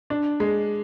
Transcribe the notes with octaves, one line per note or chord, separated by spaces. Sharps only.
D4
G#3